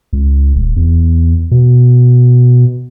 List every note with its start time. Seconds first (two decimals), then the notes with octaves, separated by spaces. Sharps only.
0.13 C#2
0.55 D#1
0.76 E2
1.51 B2